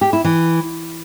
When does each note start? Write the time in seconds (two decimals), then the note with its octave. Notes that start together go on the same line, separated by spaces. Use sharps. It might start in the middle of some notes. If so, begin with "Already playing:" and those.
0.01 G4
0.13 E4
0.24 E3